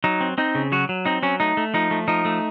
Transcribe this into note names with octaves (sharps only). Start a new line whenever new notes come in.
F#3 D#4
C4
C4 D#4
C#3
F#3 F#4
F#3
C4 D#4
F#3 C#4
A3 D#4
A3
F3 D#4
A3
F3 D#4
A3